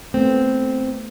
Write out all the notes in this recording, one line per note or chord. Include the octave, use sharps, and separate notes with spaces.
A3 B3 C4